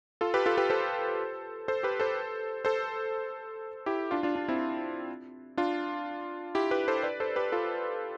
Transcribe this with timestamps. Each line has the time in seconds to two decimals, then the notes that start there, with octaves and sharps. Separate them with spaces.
0.21 F4 A4
0.34 G4 B4
0.46 F4 A4
0.57 G4 B4
0.70 A4 C5
1.68 A4 C5
1.83 G4 B4
2.00 A4 C5
2.65 A4 C5
3.86 E4 G4
4.11 D4 F4
4.23 D4 F4
4.36 D4
4.48 C4 E4
5.57 D4 F4
6.55 E4 G4
6.71 G4 B4
6.88 A4 C5
7.03 B4 D5
7.20 A4 C5
7.36 G4 B4
7.52 F4 A4